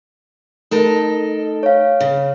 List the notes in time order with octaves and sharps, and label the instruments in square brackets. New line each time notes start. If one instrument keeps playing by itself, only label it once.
[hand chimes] A3 [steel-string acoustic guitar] D#4 A4 A#4
[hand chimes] C#5 F5
[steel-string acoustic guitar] C#3